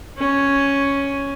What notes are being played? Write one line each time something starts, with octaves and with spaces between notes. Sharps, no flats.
C#4